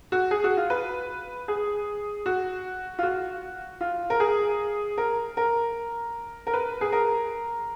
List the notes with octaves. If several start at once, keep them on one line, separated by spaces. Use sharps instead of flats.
F#4
G#4
F#4
F4
B4
G#4
F#4
F4
F#4
F4
A#4
G#4
A#4
A#4
A#4
B4
G#4
A#4